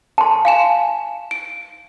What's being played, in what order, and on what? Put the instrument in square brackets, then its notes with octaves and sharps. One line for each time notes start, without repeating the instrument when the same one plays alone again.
[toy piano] A5 C6
[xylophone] F5 G#5 E7
D7